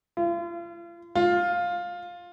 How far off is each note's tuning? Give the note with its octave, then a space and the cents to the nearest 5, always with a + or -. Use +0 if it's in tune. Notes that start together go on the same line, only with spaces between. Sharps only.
F4 -40
F4 +10